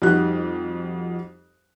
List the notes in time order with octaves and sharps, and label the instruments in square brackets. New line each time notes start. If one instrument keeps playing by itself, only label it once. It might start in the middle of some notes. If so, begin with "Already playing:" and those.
[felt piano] F2 G3 D#4 F#4 G4 F#6